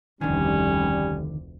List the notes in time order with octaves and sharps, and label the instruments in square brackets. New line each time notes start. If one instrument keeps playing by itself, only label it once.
[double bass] F1 D2 [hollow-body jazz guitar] D3 D#3 [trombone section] G3 [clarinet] C#4